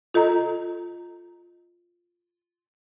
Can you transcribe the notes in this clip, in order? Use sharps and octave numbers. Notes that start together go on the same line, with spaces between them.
F4 A4 D#5 A#5